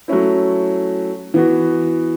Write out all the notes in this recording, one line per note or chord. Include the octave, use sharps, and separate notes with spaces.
F#3 A3 C#4 E4
E3 B3 F#4